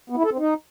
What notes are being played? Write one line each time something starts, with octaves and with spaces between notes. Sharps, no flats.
B3
E4
A4
C4
D#4